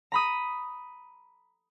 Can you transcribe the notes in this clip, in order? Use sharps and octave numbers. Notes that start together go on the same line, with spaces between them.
A#5 B5 D#6